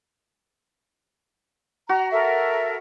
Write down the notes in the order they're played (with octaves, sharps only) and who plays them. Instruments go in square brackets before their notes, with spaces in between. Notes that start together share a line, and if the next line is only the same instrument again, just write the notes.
[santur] F#4 [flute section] A#5
[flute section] A4 A#4 E5